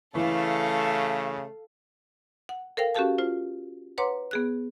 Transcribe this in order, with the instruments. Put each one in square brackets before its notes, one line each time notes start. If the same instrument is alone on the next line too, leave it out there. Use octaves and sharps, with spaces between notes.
[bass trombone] C#3 [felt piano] E3 [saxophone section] A3 [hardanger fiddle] A4 F5
[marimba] F#5
A4 A#4 C5 F5 G5
C#4 F#4 G4 A4 F5 A5
F4 C5
B4 C#5 F#5 A#5 C6 D6
B3 G#4 F#6